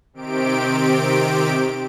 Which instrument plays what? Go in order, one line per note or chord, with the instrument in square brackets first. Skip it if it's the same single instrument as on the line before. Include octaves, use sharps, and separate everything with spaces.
[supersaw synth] C3 D#3 C4 G4 D7